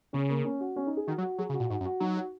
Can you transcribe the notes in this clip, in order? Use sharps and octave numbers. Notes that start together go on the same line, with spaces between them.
C#3 C#4
A#3
C#4
F#4
C#4
D#4
G#4
D#3 F#4
F#3
F#4
F#3 G#4
C#3
F#4
A#2
G#2 F#4
F#2
F#4
F#3 D#4
F#4